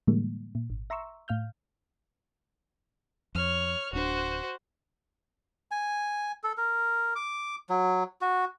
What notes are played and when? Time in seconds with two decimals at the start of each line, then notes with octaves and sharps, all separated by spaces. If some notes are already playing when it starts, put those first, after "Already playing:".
0.07 A2 D3 E3 G3 G#3 A#3
0.55 A#2
0.70 G#1
0.90 E5 A#5 C6 C#6 E6
1.28 A2 F5 F6 G6
3.35 F2 C#5 F6
3.93 D1 D4 F#4 C5
5.71 G#5
6.44 A4
6.57 A#4
7.16 D6
7.69 F#3
8.21 F#4